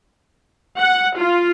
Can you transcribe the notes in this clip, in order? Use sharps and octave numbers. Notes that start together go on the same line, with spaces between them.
F#5
F4